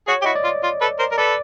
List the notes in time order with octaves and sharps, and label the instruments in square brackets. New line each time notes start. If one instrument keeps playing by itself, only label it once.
[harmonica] F#4 G#4 [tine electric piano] C#5
[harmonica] E4 F#4 G4 [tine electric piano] D#5
[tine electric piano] D5
[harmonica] F4
F4
A4 B4
A#4 C5
A#4
[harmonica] A4 B4 [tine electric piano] D5